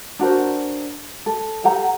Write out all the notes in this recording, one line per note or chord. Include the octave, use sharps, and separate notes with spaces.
D4 F#4 A#4 C5
A4
G4 A4 F#5 A#5